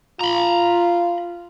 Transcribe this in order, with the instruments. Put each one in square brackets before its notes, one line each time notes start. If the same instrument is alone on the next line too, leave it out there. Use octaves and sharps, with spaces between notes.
[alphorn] F4 [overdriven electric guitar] A#5 B5